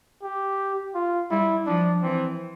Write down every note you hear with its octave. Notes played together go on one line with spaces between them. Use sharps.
G4
F4
G3 E4
F3 D4
E3 C4